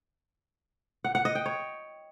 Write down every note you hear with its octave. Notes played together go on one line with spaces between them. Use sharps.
F#5
F#5
D#5
G5
C#5